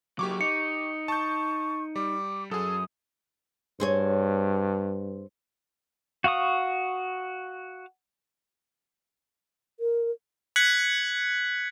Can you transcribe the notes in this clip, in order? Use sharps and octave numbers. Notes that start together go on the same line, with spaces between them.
F#3 A#3 G4 C#6 D6
D#4 C#7
A5 C#6 G6
G3 D6
F#2 G#4 A4 D#6
G2 C4 G#4 C#5
F#4 F5 C#6 D#6
A#4
F#6 G#6 B6 C#7 F#7